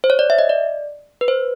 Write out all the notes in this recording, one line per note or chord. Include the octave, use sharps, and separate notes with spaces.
C5
C#5
D5
E5
D#5
D5
B4
C5